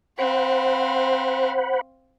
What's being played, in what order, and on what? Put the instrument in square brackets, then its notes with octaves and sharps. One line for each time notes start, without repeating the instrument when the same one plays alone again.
[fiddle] C4 F5 [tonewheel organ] C5 F#5 B5